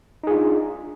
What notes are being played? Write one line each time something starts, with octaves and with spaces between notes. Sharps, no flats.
D4 D#4 F4 G#4